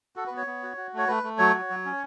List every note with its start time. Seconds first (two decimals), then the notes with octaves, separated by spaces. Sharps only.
0.16 F#4 A4
0.27 B4
0.31 B3
0.37 C#5
0.47 B3
0.63 F#4
0.77 F#4
0.94 A3 C#5
1.08 A3 B4
1.23 A3
1.38 F#3 C#5
1.54 F#4
1.70 F#3
1.85 C#4